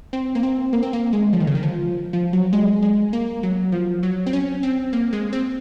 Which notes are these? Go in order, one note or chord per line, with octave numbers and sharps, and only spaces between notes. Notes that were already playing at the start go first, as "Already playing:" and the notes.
C4
A#3
C4
A#3
C4
A#3
G#3
F3
D#3
C#3
D#3
F3
F3
F#3
G#3
G#3
A#3
F#3
F3
F#3
C4
C#4
C4
A#3
G#3
C4